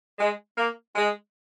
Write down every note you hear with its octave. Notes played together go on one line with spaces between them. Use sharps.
G#3
A#3
G#3